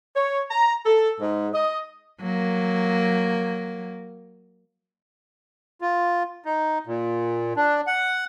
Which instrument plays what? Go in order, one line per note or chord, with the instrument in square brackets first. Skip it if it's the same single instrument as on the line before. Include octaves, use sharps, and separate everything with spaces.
[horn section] C#5
A#5
A4
G#2
D#5
[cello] F#3 A#3
[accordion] F4
D#4
A#2
D4
F#5